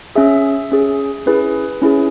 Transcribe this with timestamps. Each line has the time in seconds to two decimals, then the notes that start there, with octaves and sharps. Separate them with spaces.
0.15 C#4 G#4 E5
0.72 C#4 G#4
1.26 C#4 E4 G#4 B4
1.82 C#4 E4 G#4